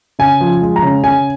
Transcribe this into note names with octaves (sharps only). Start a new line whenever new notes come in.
C#3 G#5
F3
G#3
A#5
C#3
C#3 G#5